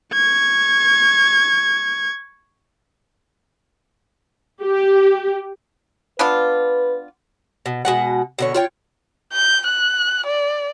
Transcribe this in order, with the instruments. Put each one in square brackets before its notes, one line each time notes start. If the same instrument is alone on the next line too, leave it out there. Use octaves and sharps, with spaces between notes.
[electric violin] C#6 G#6
[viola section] G4
[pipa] B3 D4 F4 [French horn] B4
[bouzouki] B2
B2 G#3 F#5
B2 D3 C#5
F4 C#5 G5
[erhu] G6
F#6
D5